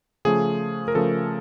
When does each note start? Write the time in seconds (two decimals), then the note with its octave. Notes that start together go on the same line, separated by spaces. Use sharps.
0.25 C#3 F3 A3 G#4
0.88 A#4
0.95 C#3 F3 A3 A4